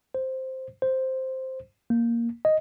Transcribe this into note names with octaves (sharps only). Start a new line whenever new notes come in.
C5
C5
A#3
D#5